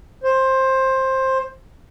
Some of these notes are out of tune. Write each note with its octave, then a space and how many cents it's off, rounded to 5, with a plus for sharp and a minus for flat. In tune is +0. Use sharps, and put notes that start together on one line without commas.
C5 +15